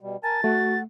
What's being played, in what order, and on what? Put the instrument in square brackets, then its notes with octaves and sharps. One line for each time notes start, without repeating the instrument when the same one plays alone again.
[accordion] B2 G3
[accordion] A#4 G#5 A5 [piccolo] A6
[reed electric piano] A3 [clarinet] F#4 [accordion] F#5